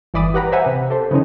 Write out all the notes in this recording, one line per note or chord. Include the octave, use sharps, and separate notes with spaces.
G1 E3 D5 B5 D#6
G4 B4 F#5 A#5 B5
B4 C5 E5 F#5 G#5 A#5
C3
G4 A4 C5
C#3 E3 F3 C#4 D#4